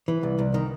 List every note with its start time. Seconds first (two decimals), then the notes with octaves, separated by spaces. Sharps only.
0.08 E3
0.23 C2
0.39 C2
0.54 D#3